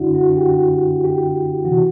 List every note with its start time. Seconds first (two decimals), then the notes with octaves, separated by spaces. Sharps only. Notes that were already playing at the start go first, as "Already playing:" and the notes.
Already playing: F#2 D3 D4 E4 F#4
0.15 F#4
0.37 G4
0.45 F#4
1.04 G4
1.65 C3 E3 F#4